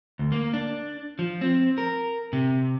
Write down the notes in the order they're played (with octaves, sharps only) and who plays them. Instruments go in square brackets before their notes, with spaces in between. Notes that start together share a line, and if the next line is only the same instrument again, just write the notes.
[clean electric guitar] D2
A#3
D4
F3
C4
A#4
C3